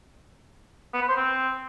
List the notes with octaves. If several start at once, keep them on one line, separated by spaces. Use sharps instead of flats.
B3
B4
C5
C4